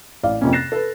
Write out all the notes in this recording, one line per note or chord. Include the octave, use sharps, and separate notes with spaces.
A1 D5 F5
F2 C3 A#3 C#4
F#6 A6 A#6 C7 E7
A4 B4